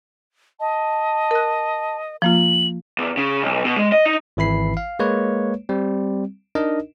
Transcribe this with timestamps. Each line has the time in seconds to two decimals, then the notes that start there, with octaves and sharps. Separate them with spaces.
0.60 D#5 A5
1.31 A#4 F#6
2.22 F3 A#3 F4 F#7
2.98 E2
3.17 C#3
3.42 B1
3.65 B2
3.78 G#3
3.92 D#5
4.06 D#4
4.37 G#1 E3 E4 B5 C7
4.77 F5
4.99 G#3 A#3 B4 C#5
5.69 G3 C4
6.55 D4 D#4 A#4 D#5